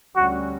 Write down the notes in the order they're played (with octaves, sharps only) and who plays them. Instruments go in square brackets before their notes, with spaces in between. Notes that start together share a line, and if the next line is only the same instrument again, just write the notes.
[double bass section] D2 D3 G3 C#4 [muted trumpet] F#4